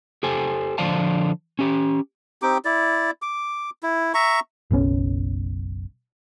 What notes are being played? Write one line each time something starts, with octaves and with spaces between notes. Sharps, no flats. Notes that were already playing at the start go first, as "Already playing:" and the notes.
G4 A4 C5 G#5
D3 F3 C5 D5 F5 A5
C#4 G4
C4 D#4 G4 D6
E4 D5
D6
E4
E5 A#5 C#6
F#1 B1 C3 C#4